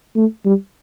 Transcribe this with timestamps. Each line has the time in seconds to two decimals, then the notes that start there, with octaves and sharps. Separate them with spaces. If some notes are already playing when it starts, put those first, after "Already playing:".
0.16 A3
0.45 G3